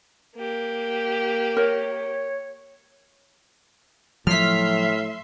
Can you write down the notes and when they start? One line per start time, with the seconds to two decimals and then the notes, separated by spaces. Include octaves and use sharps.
0.36 A#3 G4
1.57 A#4 C#5
4.27 A2 F3 F#3 E5 C6 F6 B6